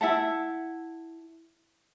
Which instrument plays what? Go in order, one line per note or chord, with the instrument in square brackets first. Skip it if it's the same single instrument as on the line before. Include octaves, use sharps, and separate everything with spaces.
[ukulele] E4 E5 F#5 A5